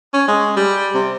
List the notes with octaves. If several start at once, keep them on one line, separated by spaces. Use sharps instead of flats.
C#4
G#3
G3
C3